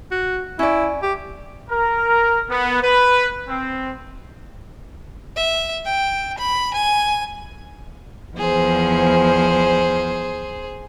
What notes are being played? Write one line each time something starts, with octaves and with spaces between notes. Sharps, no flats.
F#4
C#4 E4 D5
G4
A#4
B3
B4
C4
E5
G5
B5
G#5
E2 F3 G#4 C5